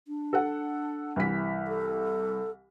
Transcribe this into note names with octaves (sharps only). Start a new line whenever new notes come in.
D4
A4 F#5
C2 E3 B6
A4